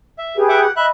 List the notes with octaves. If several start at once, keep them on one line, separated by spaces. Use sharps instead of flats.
E5
G4 G#4 B4
E5 F#5 D6
F#5
D#5 E5 B5 F#6